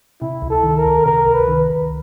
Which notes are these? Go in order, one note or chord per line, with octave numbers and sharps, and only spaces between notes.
C3 E4
C#2
A4
D#3
A#4
C#2
C3 A#4
C#2
B4
D#3
C#2